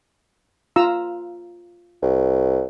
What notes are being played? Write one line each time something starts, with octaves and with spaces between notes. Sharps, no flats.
F4 A#5 E6
C2